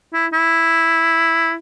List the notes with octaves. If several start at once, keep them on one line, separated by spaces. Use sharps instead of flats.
E4
E4